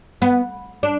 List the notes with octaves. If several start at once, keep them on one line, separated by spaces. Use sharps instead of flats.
B3
D4